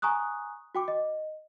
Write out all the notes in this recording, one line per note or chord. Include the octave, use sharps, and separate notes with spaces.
G#5 A#5 C#6 D#6 F#6
F#4 G5 D6
D#5